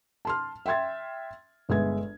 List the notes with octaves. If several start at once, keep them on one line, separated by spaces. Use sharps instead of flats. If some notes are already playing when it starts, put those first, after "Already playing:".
A5 C6 F6
E5 G5 C6 G#6 A6
G1 G#3 B3 E5 G#6